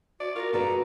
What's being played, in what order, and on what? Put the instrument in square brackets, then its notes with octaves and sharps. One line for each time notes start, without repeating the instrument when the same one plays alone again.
[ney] F#4 [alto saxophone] D5
[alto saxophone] F4 [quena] A#4
[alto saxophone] D3 [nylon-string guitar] G#4 B4 D5 [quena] A#5